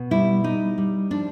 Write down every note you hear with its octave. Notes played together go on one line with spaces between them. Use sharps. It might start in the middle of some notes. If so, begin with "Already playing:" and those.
Already playing: B2
G3 E4
G3 D#4
G3
F3 D4